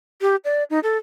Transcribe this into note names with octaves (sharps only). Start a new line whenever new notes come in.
G4
D5
D#4
A4